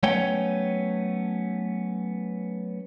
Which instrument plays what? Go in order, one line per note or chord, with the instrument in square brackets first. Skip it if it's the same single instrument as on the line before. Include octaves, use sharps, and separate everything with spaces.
[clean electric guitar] F#3 A3 B3 C#4 C#5 G5